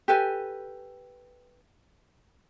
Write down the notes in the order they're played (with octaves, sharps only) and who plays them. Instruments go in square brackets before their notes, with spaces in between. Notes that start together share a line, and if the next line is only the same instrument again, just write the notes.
[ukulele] G4 A4 B4 G#5